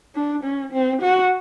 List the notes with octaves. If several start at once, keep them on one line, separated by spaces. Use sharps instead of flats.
D4
C#4
C4
F#4